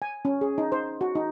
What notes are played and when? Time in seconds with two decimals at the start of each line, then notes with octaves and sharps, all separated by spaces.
0.02 G#5
0.25 C#4
0.41 G#4
0.58 D#4
0.72 C5
1.01 F#4
1.15 D#4